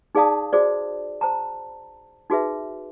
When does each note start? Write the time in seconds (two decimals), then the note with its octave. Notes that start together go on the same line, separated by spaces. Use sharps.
0.15 D#4 G#4 D5 F5 A5 D#6
0.53 F#4 G#4 C5 D5
1.21 C5 A5 A#5
2.30 D#4 F#4 G#4 B4 E5